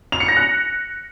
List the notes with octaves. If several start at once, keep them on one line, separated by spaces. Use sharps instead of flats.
F7
C#7
A#6
F#6